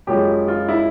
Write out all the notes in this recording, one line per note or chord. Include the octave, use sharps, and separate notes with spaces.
F#2 C#3 F3 G#3 G4
F4
E4